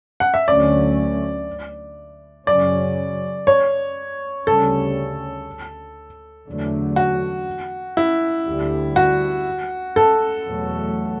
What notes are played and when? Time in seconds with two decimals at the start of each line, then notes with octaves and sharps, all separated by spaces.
0.20 F#5
0.34 E5
0.47 D2 D3 F#3 A3 C#4 D5
2.47 F#2 C#3 F#3 C#4 D5
3.47 C#5
4.46 D2 C#3 G3 C#4 A4
6.47 E2 D3 F#3 A3
6.96 F#4
7.97 E4
8.47 D2 D3 G3
8.96 F#4
9.96 A4
10.46 E2 B2 F#3 A3